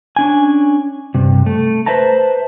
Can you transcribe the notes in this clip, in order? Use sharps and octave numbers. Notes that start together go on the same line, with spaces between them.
C#4 D4 G#5
G2 C3
A3
B4 C5 E5 A5 A#5